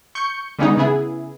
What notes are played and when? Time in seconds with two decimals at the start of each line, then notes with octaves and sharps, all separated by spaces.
0.15 C#6 G6 C#7
0.59 D3 G3 G#3 B3 C#4 D#4
0.77 C#3 B3 E4 G#4